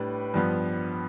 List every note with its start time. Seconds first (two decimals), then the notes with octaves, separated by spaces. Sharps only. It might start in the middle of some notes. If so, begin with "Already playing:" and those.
Already playing: A2 G3 D4 B4
0.34 G2 F3 B3